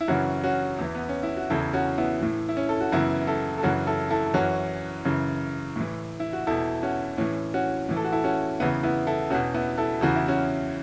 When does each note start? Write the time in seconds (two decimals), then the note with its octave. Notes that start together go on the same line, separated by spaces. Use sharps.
0.01 E4
0.08 F#2 C#3 E3 C#4 F#4
0.43 C#4 F#4
0.79 E2 E3
0.95 B3
1.09 C#4
1.23 E4
1.37 F#4
1.50 E2 C#3 E3 E4 A4
1.73 C#4 F#4
1.98 B3 E4
2.21 A2 E3
2.49 E4
2.57 C#4
2.69 A4
2.81 F#4
2.92 F#2 C#3 E3 B3 E4
3.27 E4 A4
3.58 A4
3.63 F#2 C#3 E3 C#4 F#4
3.87 E4 A4
4.11 E4 A4
4.34 F#2 E3 C#4 F#4
5.05 F#2 C#3 E3
5.76 A2 E3
6.20 E4
6.33 F#4
6.47 E2 B2 E4 A4
6.83 C#4 F#4
7.17 A2 E3 C#4
7.54 C#4 F#4
7.89 A2 E3
7.97 A4
8.04 F#4
8.12 E4 A4
8.24 C#4 F#4
8.60 E2 C#3 E3 B3 E4
8.83 B3 E4
9.07 E4 A4
9.30 E2 C#4 F#4
9.35 B2
9.54 B3 E4
9.78 E4 A4
10.01 E2 C#3 E3 F#4
10.16 E4
10.28 C#4 F#4